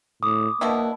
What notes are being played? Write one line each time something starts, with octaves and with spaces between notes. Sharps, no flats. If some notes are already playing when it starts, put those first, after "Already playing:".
A2 D6 D#6
B2 A#3 D4 E4